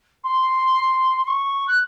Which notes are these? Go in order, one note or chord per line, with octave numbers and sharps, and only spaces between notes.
C6
C6
C#6
F#6